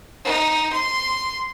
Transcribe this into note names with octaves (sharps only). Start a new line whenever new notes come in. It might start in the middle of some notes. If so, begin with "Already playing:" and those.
D#4
C6